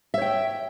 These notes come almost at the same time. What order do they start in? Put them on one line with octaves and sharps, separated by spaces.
E5 C#5 G5